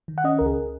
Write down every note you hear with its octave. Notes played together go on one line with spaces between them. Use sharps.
D#3
F#5
C#4 D#5
C#2 A#4
G#4